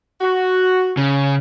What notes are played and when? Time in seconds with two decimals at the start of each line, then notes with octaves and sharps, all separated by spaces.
0.21 F#4
0.97 C#3